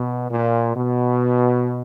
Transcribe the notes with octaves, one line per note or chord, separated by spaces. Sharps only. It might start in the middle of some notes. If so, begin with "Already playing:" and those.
Already playing: B2
A#2
B2